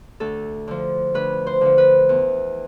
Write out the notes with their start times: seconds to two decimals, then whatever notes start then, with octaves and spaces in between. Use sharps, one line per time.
0.20 D2 A4
0.68 D3 F3
1.14 D2 B4
1.47 C5
1.61 D3 F3
1.78 B4
2.09 E2